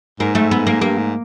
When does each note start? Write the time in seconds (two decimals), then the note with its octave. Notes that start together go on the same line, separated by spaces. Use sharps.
0.20 G#2 A#3
0.35 A3
0.51 B3
0.67 A#3
0.82 G2 A#3
0.98 G#2